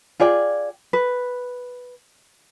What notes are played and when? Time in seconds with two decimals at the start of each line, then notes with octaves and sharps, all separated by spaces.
0.20 F4 G#4 D5 G5
0.93 B4